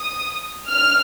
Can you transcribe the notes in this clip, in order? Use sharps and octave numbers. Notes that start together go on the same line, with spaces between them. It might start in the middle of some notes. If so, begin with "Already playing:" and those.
Already playing: D#6
F6